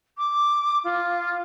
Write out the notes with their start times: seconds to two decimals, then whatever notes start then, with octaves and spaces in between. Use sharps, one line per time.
0.18 D6
0.84 F4